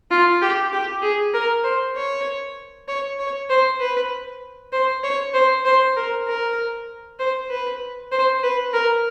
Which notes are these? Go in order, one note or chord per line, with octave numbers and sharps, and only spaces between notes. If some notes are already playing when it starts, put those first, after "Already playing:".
F4
G4
G4
G#4
A#4
C5
C#5
C#5
C#5
C5
B4
C5
C#5
C5
C5
A#4
A#4
C5
B4
C5
B4
A#4